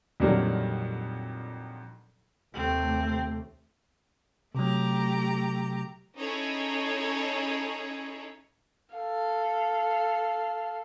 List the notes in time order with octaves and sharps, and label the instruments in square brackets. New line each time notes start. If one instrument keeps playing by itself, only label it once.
[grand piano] F2 A#2 D3 D#3 F#3 G3
[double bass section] D#2 C3 A3 [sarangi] C4
[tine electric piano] C3 F#3 [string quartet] A3 G4 A#5
[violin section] C#4 D#4 E4 G#4 A4 C#5
[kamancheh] A4 F5